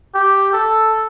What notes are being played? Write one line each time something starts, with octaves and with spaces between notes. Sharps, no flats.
G4
A4